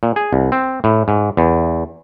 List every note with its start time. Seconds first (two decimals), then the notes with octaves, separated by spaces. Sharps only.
0.03 A#2
0.16 G#4
0.33 C2
0.52 C4
0.84 A2
1.08 G#2
1.37 E2